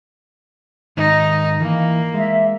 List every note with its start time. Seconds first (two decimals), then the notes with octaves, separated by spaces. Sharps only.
0.97 G#2 D#3 D#4
1.61 E3 A#3
2.14 G#3 E5